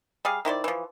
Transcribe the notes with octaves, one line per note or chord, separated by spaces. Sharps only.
G3 G#4 F5
D#3 E4 C5 D5
E3 F3